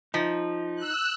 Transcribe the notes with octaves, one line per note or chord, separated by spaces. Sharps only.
F3 D#4
E6 F#6